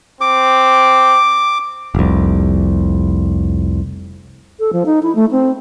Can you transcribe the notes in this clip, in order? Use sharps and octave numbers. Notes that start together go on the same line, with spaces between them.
C4 D6
F1 C2
A4
F3
D#4
E4
A3
C4